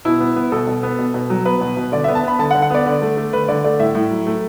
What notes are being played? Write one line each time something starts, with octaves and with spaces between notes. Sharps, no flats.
B2 E4
B3
B3
B2 A4
B2
B3
B2
B2
F#3
B3 B4
B2
B2
D3 D5
B3 E5
A5
B3 B5
D3 A5
F#5
D3
F#5
B3 D5
D3
A3
A3
D3 B4
D3 D5
A3 D5
A2 E5
A2
F#3
A3